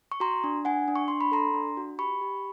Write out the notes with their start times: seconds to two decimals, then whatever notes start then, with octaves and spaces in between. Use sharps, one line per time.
0.12 C#6
0.20 F#4 A#5 C6
0.44 D4
0.65 D4 F#5 G#5
0.88 D4
0.96 C#6
1.08 D4 C6
1.21 B5
1.32 A4 A#5 C6
1.54 D4
1.77 F#4
1.99 G4 B5 C#6
2.21 G4